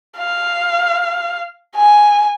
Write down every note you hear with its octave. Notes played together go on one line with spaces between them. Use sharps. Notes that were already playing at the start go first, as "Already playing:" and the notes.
F5
G#5